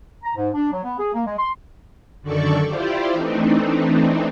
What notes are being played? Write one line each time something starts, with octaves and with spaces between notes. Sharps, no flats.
A#5
G#2
D4
F#3
B3
G#4
A#3
G#3
C6
F#2 D3 D#3 A4 D5 C#6
E4 F4 G4 C5 D5
E3 A3 C4 D4 D#4